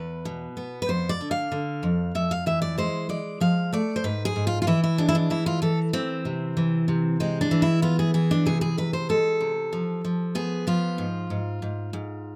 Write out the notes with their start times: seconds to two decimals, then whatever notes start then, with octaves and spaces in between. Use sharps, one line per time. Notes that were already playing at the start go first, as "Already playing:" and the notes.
Already playing: E2 B4
0.25 B2
0.57 B3
0.82 B4
0.89 F2 C5
1.09 D5
1.21 D3
1.31 F5
1.52 D3
1.83 F2
2.15 F2 E5
2.31 F5
2.46 E3 E5
2.62 D5
2.78 G#3 C5
3.09 G#3 D5
3.40 F3 F5
3.73 A3 D5
3.96 C5
4.04 G#2 B4
4.25 G#4
4.36 G#2
4.47 F4
4.62 F4
4.67 E3 E4
4.84 E4
4.98 G#3 D4
5.09 E4
5.15 D4
5.30 E3 E4
5.46 F4
5.62 E3 A4
5.93 E3 C4
6.25 C3
6.57 E3
6.88 C3
7.20 G#3 C4
7.41 D4
7.51 E3
7.62 E4
7.82 B3 F4
7.99 G#4
8.14 E3 G#4
8.31 D4
8.46 C3 G#4
8.61 G#4
8.78 C3 B4
8.93 C5
9.09 G#3 A4
9.41 C3
9.73 F3
10.05 F3
10.35 B3 G#4
10.67 F3 F4
10.98 G#2
11.30 G#2
11.62 G#2
11.93 G#2